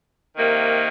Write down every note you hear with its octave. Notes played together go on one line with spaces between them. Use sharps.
C3 D#3 A#3